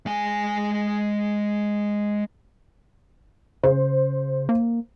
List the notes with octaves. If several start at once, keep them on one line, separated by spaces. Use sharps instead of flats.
G#3 G#5
C#3 C5
A#3